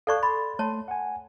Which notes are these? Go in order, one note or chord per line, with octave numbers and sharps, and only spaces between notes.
A4 D5 F5 A5 C#6 F#6
B5 C6 A6
A3 C#5 A5 C6
F#5 G#5